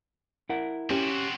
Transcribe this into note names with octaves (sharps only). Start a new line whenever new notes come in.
E4 A#4 F#5
C4 C#4 F#4 G4